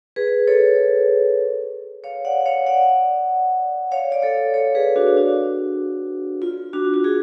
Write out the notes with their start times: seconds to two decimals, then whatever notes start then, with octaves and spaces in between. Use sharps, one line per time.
0.16 G#4 B4
0.47 A4 C#5
2.04 C#5 F5
2.25 D5 F#5
2.41 F#5
2.45 C#5 F5
2.67 D5 F#5
3.92 C#5 F5
4.12 D5
4.22 A4 C#5
4.54 A4 C#5
4.75 G#4 B4
4.96 D4 F#4
5.17 D4 F#4
6.42 F4
6.73 D4 F#4
6.94 F#4
7.04 F4 G#4